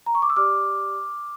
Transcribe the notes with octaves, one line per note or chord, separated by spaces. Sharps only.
A#5
C#6
D6
E6
G4 D5 D6 F6